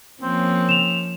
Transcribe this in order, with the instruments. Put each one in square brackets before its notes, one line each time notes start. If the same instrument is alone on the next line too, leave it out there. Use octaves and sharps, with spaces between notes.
[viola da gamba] F3 A#3 C#4 [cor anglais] C4
[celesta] E7 F7